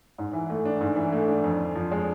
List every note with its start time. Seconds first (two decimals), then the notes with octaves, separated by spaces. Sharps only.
0.18 G#2
0.33 E3
0.50 A3
0.65 D4
0.81 G#2
0.96 E3
1.12 A3
1.28 D4
1.44 F2
1.60 D3
1.75 F3
1.92 G#3